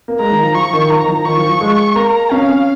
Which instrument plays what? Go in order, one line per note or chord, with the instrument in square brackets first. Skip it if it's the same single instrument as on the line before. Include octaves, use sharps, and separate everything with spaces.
[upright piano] A#3
[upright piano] G#3 [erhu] A#5
[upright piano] D#3
F3
[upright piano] F3 [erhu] C#6
[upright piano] D#3
[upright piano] F3 [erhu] A#5
[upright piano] D#3
F3
[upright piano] D#3 [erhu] C#6
[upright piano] F3
F3
G#3
[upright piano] A#3 [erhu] A#5
[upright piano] C#4 [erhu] F5
[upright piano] C#4